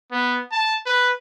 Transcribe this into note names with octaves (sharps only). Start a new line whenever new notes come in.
B3
A5
B4